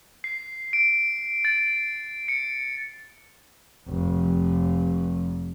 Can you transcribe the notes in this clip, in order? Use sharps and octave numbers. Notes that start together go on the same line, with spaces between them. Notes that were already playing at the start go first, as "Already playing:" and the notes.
C7
D7
A6
C#7
F1 F3